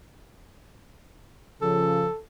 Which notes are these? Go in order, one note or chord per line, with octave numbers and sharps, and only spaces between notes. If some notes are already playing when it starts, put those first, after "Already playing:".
C#3 F3 A4